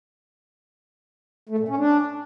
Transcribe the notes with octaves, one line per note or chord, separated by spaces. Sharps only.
A3
A#2
C#4
D4